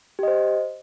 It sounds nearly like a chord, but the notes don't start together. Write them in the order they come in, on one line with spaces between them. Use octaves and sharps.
G4 D#5 C5